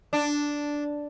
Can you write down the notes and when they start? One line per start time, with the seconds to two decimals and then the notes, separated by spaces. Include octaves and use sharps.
0.13 D4